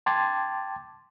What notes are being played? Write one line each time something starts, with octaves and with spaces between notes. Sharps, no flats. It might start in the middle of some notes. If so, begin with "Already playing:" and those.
G5 A5 C6 D6 G#6 A6